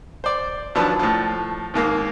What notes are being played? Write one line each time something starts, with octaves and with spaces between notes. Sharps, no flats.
C5 D5
D#2 F3 F#3 D4 B4
A2 F3
D#2 G#2 A#3